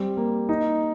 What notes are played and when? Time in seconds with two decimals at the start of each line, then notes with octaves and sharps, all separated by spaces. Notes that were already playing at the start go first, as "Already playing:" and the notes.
Already playing: G3 C4
0.17 A#3
0.49 D#4